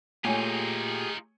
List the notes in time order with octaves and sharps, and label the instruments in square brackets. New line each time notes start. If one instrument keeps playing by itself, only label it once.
[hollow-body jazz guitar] A#2 [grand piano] A3 C#5 G#5 [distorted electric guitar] D#4 F4 [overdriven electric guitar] G4 G#4